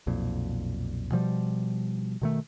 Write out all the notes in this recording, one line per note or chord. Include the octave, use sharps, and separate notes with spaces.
B1 F2 A#2
B2 F3 G3
B2 D#3 A3